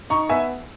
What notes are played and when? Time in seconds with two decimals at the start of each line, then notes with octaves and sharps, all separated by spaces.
0.10 D#4 A#5 C#6
0.29 B3 E5 G#5